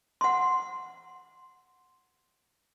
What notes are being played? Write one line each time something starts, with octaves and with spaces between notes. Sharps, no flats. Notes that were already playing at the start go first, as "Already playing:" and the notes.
F#5 C6